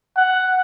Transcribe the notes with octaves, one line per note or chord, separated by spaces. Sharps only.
F#5